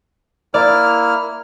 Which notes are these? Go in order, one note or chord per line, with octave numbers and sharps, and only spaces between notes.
A#3 E4 D5 F6